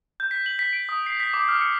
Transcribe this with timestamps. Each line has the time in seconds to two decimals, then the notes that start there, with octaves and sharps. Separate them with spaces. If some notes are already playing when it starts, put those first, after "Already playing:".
0.20 G6
0.31 B6
0.46 F#7
0.59 B6
0.73 D7
0.89 D#6
1.06 C7
1.20 B6
1.34 D6
1.48 F6
1.61 C#7